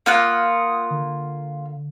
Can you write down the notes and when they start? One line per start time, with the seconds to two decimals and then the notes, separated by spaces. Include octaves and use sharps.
0.06 A#3 F4 F#5 D#6
0.91 D3